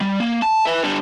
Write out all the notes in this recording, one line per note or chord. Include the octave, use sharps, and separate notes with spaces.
G3
A#3
A5
B4 E5
D3 G3